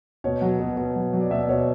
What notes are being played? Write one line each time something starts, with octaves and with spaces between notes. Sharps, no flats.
B2 C#5
F#3
B2
B2
F#3
F#3
D5
B2 E5
B2 C#5